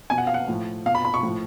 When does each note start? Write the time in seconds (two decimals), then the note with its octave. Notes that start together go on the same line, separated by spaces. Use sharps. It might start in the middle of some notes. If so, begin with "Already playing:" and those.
0.10 B2 G#5
0.18 F#5
0.27 F5
0.34 F#5
0.48 A2 F3
0.86 B2 F5
0.95 B5
1.05 B5
1.14 C#6
1.23 A2 F3